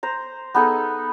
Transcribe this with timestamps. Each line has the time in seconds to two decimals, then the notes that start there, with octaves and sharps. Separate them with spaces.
0.03 C5 A#5
0.54 B3 D#4 G#4 A4